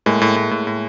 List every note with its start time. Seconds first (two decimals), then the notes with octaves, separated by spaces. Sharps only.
0.06 A2 G#3 A#3
0.21 A2
0.36 A2
0.51 A2
0.67 A2